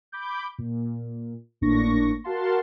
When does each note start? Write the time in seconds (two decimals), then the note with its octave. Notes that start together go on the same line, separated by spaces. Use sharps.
0.12 B5 D6 G6
0.58 A#2
1.61 G#1 A2 A#3 D4 C#6 A#6
2.24 F#4 A#4 F5 F#5 A5 C6